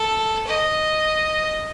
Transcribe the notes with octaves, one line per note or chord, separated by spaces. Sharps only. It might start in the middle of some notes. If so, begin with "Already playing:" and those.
Already playing: A4
D#5